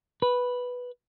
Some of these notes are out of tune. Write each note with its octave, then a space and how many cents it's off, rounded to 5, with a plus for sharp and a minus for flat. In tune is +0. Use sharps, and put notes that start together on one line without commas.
B4 -5